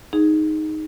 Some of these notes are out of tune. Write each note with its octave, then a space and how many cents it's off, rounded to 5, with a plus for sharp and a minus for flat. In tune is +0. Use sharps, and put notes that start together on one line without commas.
D#4 +0 G#4 +0